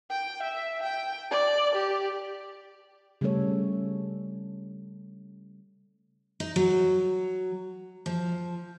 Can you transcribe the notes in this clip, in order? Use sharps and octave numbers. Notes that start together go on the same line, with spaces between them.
G5
E5
G5
D5
G4
C#3 G3 A3 C#4 A4 C#5
D#4
F#3
F3